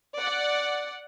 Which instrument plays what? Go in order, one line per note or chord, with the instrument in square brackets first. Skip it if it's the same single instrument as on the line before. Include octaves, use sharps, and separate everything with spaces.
[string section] D5 F#5